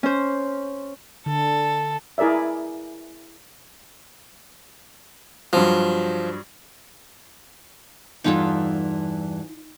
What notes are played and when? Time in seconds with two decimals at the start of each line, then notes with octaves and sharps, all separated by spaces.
0.03 C#4 C5
1.26 D3 A4
2.18 E4 G#4 A#4 D5 E5
5.53 G2 F3 F#3
8.24 E2 G2 E3 D#4 F4 A4